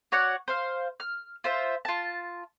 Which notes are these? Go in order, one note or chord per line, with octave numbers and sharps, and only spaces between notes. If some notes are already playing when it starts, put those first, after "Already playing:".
F#4 C#5 D5 F#5
C5 F5
F6
F4 C5 E5
F4 A5